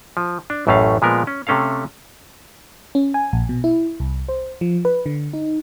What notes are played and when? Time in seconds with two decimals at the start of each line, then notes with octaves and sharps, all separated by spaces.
0.17 F3
0.50 D4
0.67 A1 F#2 A2 A3 C#4 F5
1.02 A#2 F3 G#3 B3 A#4
1.27 C#4
1.47 C3 A3 C#4 A4 F5
2.95 C#4
3.14 G#5
3.33 A#1
3.49 B2
3.64 E4
4.00 C2
4.28 C5
4.61 F3
4.85 B4
5.06 D3
5.33 D#4